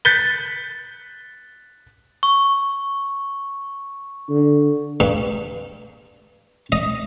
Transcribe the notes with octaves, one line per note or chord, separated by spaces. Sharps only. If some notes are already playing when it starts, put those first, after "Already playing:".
F#6 G6 A6 B6 C#7 G7
C#6
D3
G2
D#5